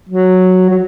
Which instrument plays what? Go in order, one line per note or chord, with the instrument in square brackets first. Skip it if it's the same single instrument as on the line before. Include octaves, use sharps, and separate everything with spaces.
[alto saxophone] F#3
F#3